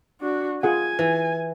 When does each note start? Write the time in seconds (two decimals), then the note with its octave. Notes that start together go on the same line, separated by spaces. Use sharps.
0.21 D4 F#4
0.63 F4 G#4 F#5 G#5
0.99 E3